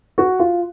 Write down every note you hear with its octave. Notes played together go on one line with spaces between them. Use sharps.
F#4
F4